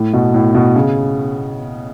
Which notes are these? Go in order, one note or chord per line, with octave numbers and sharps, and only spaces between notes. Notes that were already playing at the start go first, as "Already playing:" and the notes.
Already playing: A2
B2
A2
B2
C#3